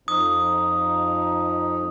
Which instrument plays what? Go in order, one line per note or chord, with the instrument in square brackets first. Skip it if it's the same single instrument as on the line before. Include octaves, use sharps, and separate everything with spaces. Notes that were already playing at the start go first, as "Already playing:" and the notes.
[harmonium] F2 F3 D#4 [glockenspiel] D#6